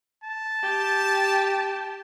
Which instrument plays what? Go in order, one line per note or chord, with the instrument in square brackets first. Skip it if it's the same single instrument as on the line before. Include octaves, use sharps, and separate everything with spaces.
[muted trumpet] A5
[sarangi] G4